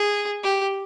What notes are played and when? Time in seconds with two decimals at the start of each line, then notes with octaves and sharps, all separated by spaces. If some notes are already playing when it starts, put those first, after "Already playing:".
Already playing: G#4
0.44 G4